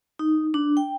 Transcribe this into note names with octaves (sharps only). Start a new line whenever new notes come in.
D#4
D4
G5